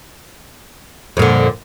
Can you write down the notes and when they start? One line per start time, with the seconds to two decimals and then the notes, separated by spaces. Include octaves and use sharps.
1.17 F2
1.19 A#2
1.22 D3